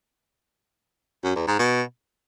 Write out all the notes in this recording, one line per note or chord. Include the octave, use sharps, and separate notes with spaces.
F#2
E2
G#2
B2